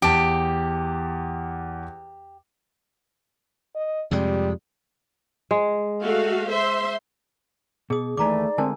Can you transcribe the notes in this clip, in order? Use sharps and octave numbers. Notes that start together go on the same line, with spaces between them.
E2 G4 A5
D#5
F2 C3 G3 G#3
G#3
A3 F#4 F5
C5 E5 C6
B2 G#4 D#6
D#2 E3 A3 D#4 B4 D5 A#5 D6
D3 G#3 A3 C4 D4 A#4 A5